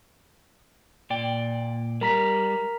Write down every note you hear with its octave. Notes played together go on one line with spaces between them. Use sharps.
A#2 D5 G5
G3 A#4 A#5 B6